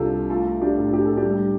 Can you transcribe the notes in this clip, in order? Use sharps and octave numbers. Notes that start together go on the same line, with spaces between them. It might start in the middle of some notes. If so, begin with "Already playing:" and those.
Already playing: C2 C3 D4 F4 G4 A4
A3 F4 A4
D4 G4
A2
G4
A4
D4 G4
G3